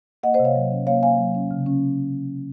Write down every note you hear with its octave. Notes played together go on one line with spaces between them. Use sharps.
A#3 D#5 F#5
C5 D#5
C3
C#5 F5
F#3
C#4
A#3 C#5 F5
A#3 F5 G#5
F#3
C#4
C#3
C#4